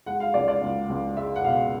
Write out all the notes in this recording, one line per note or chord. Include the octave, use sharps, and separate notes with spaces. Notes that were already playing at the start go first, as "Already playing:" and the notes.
G#3 F#5
F5
C#2 D5
D5
C#2
C#2
G#3 E5
F#5
B2 F5